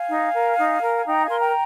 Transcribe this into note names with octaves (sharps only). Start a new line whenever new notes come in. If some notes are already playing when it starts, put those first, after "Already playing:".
Already playing: F5 G#5
D#4
A#4
D#4
A#4
G#5
D#4 G5 A#5
F5 G#5
A#4 C6
G5 A#5